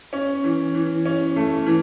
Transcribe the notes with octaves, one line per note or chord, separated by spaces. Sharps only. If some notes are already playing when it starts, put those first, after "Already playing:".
C#4
E3
E3
C#4
A3
E3